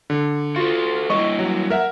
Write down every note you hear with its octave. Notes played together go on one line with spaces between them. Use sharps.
D3
F4 F#4 A4
G3 A#3 E4 D#5 C#6
F#3
A#4 E5 F#5